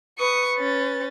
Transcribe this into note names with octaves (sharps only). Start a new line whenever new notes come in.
B4 C#6 D#6
C#4 A6